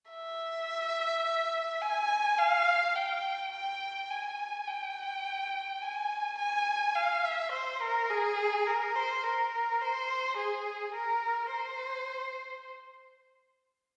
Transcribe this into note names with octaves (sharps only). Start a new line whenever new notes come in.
E5
G#5
F5
G5
G5
G#5
G5
G#5
G#5
F5
E5
C5
A#4
G#4
A#4
C5
A#4
C5
G#4
A#4
C5